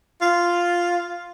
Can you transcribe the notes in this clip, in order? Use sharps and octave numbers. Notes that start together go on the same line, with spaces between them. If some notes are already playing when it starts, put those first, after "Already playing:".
F4